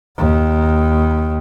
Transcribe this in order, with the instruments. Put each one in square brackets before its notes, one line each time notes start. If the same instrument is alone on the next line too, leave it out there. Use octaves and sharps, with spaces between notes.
[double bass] D#2